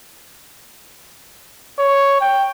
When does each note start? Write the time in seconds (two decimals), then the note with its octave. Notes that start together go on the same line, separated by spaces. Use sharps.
1.78 C#5
2.21 G5